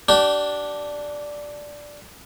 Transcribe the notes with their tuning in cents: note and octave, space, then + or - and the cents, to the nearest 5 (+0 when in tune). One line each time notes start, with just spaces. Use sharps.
D4 +0 G4 -30